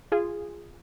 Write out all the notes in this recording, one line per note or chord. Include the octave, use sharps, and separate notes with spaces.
F4 G#4